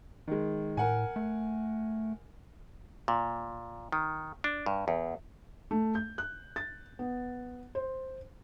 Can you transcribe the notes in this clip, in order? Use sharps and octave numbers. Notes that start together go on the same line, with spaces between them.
D#3 G#3
A2 A#4 F#5 G#5
A3
A#2
D#3
D4
G2
E2
A3
G6
F#6
A6
B3
C5